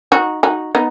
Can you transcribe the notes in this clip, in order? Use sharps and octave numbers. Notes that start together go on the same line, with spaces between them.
D#4 F#4
D#4 F#4
B3 D#4